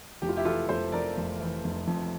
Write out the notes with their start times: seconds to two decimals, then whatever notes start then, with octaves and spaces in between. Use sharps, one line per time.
0.22 F1 G4
0.29 F4
0.36 E4 G4
0.45 E3 F4 A4
0.69 F1 A4 C5
0.92 F2 A#4 D5
1.17 F1
1.40 E3
1.64 F1
1.87 F2